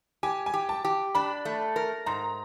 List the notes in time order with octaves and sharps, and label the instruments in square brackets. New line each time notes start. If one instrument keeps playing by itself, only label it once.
[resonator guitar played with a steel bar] G4 [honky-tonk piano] G#5
[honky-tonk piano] G#5
[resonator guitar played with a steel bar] G4
[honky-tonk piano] A5
[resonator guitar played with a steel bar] G4
[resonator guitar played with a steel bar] D4 [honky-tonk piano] B5
[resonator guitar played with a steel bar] A3
A#4
[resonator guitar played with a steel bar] G#2 [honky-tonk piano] A#5